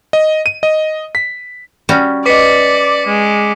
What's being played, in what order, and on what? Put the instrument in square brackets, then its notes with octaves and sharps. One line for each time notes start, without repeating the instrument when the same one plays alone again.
[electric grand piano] D#5
D#7
D#5
B6
[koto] G3 C#4 F#4
[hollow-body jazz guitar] B4 D#5 [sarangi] D5 [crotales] D6 B6 C#7
[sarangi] G#3